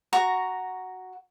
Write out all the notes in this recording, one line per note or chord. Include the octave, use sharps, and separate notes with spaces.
F#4 A#5 C#6